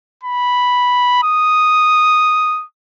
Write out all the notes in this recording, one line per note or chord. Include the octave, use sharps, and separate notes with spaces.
B5
D#6